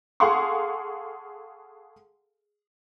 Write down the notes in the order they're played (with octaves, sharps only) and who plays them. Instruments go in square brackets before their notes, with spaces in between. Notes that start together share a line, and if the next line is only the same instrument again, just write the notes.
[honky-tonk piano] G#4 A4 F5 F#5 C6 C#6